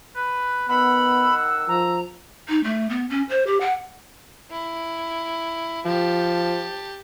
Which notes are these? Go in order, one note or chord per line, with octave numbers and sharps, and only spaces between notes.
B4
D#3 B3 F#5 B5 E6
F3 A#5
D#4
A3
B3
C#4
C5
G4
F#5
E4
F3 G4 A5